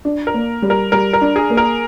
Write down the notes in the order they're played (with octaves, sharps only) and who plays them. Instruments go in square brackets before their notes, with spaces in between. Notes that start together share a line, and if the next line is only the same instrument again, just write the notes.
[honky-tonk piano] D4
[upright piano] A#4
[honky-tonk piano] A#3
G3
[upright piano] A#4
[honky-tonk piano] G3 [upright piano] A#4
[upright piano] A#4
[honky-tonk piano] D4
[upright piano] G#4
[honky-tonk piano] A#3
[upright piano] A#4